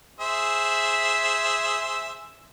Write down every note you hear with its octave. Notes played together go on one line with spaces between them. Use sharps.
G#4 C5 E5